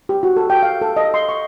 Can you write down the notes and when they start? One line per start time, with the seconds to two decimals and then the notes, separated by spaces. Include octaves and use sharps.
0.09 G4
0.23 F#4
0.37 A4
0.50 G5
0.63 F5
0.81 A4
0.97 D#5
1.14 C6
1.29 C#6